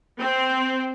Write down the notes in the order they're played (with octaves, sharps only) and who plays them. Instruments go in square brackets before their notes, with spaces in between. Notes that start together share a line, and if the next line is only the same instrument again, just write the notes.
[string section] C4